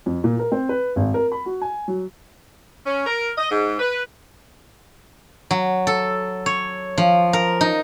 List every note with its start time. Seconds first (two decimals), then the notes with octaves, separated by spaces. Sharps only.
0.06 F2
0.24 A#2
0.39 A#4
0.52 C4
0.69 B4
0.96 G#1
1.14 A#4
1.32 B5
1.46 F#4
1.62 G#5
1.88 F#3
2.85 C#4
3.07 A#4
3.37 D#5
3.49 G#2
3.78 B4
5.51 F#3
5.87 A4
6.46 C#5
6.98 F3
7.33 A#4
7.61 D#4